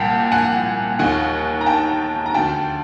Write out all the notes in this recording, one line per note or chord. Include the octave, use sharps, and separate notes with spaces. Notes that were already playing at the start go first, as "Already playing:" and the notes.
Already playing: C2 A#2 G5 A5
F#5 G#5
D#2 D#3 F#5 G#5
A#5
G5 A5
A#5
D2 D3 G5 A5